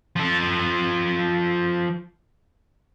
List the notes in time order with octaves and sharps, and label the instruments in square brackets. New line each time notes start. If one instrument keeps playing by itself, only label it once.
[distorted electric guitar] F3 A4